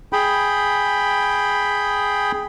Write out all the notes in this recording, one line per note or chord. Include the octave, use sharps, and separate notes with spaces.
G#4 G5 B5